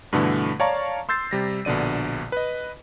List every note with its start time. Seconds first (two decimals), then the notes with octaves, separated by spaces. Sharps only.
0.13 G2 B2 D3 E3 A3
0.60 C#5 D5 F5 A5 A#5 C#6
1.09 C6 E6 G6 A6 C7
1.31 C3 G3 A#6
1.65 A#1 B2 D3 D5 D#7
2.32 B4 D#5